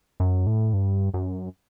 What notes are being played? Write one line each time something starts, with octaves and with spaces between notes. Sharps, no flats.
F#2
A2
G2
F#2